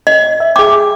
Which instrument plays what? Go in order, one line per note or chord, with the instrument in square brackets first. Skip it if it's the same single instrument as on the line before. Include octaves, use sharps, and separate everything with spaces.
[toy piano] D#5
[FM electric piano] E5
[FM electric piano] G#4 E5 G5 [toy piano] D6